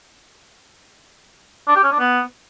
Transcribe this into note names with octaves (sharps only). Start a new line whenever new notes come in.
D4
G4
C#4
D4
B3